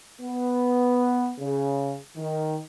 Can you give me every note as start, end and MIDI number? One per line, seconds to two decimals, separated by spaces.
0.21 1.31 59
1.39 1.94 49
2.17 2.59 51